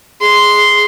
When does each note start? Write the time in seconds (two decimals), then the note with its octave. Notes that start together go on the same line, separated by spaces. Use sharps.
0.21 G#4 C6